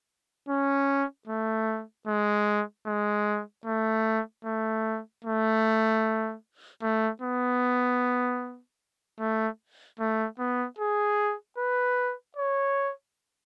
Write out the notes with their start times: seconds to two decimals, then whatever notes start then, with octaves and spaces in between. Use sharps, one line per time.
0.49 C#4
1.27 A3
2.07 G#3
2.86 G#3
3.65 A3
4.45 A3
5.24 A3
6.82 A3
7.21 B3
9.20 A3
9.99 A3
10.39 B3
10.78 G#4
11.58 B4
12.36 C#5